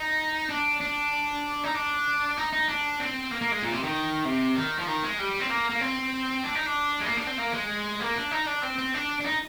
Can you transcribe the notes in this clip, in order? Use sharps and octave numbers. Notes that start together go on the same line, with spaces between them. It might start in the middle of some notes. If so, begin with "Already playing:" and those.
Already playing: D#4
D4
D4
D#4
D4
D#4
D#4
D4
C4
A#3
A#3
G#3
A#2
C3
D#3
C3
D#3
F3
D#3
G#3
G3
C4
A#3
A#3
C4
D4
D#4
D4
G#3
A#3
D4
C4
A#3
G#3
A#3
D4
D#4
D4
C4
C4
D4
D4
D#4